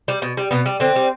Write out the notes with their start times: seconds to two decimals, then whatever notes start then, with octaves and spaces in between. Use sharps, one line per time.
0.08 G3
0.22 B2
0.37 G3
0.51 B2 B3
0.66 G3
0.80 D3 C4
0.96 G3